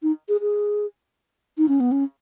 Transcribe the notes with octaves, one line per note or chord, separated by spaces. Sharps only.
D#4
G#4
G#4
D#4
C#4
B3
C#4